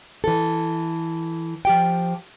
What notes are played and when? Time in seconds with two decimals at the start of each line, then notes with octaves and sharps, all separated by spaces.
0.24 E3 A4
1.65 F3 G4 G5